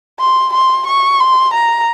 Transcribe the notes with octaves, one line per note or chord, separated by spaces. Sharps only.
C6
C6
C#6
C6
A#5